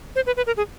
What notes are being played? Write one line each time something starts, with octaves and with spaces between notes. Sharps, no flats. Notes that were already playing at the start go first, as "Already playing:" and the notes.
C5
B4
B4
A#4
G#4